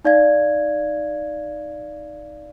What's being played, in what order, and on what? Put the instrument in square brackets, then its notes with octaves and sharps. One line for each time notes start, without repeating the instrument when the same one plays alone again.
[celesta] D#4 D5 F5 G#6